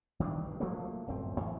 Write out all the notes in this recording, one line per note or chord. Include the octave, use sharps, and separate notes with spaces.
D#3 G3 A3 D4
G2
F3 F#3 A3 A#3
D1 G1 F#2 C4
F#2 E3